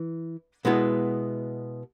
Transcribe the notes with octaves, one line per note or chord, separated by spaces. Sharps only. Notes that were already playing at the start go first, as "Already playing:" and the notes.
Already playing: E3
B2 G#3 B3 E4